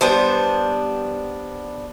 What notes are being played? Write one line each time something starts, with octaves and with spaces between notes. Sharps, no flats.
G3 B3 D4 C5